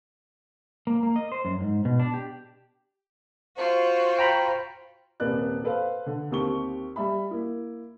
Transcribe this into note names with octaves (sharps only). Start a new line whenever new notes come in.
A#3
A#3
D#5
C5
F#2
G#2
B2
D4
G4
F4 F#4 C5
G5 A#5 B5
D#1 C3 A#3 B4 D5 F#6
A4 B4 C5 F5
D3
D#2 A#3 C4 G4 C#6 G7
G3 E5 B5
A#3 E4